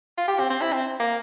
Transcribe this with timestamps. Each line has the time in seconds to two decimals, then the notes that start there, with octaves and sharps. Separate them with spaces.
0.18 F4
0.28 G4
0.39 C4
0.50 C4
0.61 E4
0.73 C4
1.00 A#3